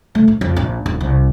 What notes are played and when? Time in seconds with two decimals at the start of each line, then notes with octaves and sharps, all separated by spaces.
0.15 A3
0.28 A#1
0.41 F2
0.56 A#1
0.86 D#1
1.01 C2